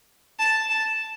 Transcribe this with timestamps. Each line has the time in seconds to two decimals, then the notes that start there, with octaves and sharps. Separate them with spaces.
0.39 A5
0.69 A5